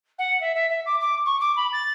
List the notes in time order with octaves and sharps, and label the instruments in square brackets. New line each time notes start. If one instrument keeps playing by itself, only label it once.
[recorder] F#5
E5
E5
E5
D6
D6
C#6
D6
B5
A6